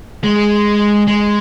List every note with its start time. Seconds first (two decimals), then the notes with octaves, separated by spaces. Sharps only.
0.24 G#3
1.07 G#3